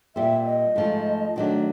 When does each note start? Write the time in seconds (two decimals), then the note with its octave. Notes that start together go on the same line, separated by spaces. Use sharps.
0.16 A#2 G3 C4 E5
0.45 D#5
0.76 G#2 F3 A3
1.36 D#3 F#3 A3 D4